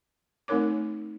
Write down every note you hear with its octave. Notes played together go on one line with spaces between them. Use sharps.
A3 C4 D#4 A#4 C#5 D6